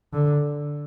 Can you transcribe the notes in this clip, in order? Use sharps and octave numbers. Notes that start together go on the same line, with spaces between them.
D3